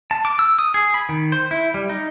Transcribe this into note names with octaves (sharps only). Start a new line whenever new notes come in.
A5
D6
E6
D#6
G#4
B5
D#3
C5
E4
G3
D#4